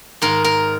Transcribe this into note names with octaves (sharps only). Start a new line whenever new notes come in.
G#2 D#3 A#4
A#4